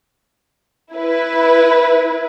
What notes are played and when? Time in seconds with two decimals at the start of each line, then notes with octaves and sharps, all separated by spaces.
0.93 E4 B4